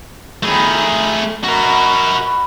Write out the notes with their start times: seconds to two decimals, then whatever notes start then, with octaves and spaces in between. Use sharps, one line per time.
0.43 F2 D#3 A3 G#4
1.44 B2 F#4 A#4